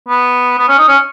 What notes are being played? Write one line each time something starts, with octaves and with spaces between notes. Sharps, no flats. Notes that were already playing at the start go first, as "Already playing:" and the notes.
B3
B3
C#4
D#4
C#4